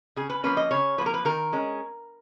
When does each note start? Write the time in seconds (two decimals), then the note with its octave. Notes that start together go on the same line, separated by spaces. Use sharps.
0.16 C#3 G#4
0.30 B4
0.44 F3 A#3 C#4 B4
0.57 D#5
0.71 C#3 C#5
0.98 F3 B4
1.01 A#3
1.06 A#4
1.14 B4
1.25 D#3 A#4
1.53 G#3 C#4